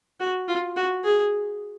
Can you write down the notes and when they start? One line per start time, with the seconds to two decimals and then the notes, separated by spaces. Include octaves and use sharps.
0.20 F#4
0.48 F4
0.76 F#4
1.04 G#4